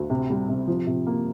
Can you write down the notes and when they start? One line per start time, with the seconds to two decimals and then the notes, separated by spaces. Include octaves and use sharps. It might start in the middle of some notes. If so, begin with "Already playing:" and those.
Already playing: D2
0.10 C3
0.30 G3
0.49 C3
0.67 F3
0.87 C3
1.07 A#3